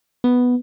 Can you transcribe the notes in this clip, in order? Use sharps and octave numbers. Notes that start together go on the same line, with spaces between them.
B3